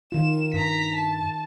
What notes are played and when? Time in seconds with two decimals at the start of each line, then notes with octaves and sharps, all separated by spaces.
0.12 D#3 F4 E7
0.54 G2 A#5 B6
0.96 A5